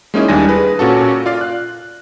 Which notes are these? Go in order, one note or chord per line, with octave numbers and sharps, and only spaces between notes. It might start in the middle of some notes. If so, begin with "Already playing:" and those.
G#3 A#3 C#4 D#4 E4 G#4
D#2 G3 D4 E4 G#5 A#6
G#4 B4
A#2 C#4 F#4 A4
F4 D5 F5
F#6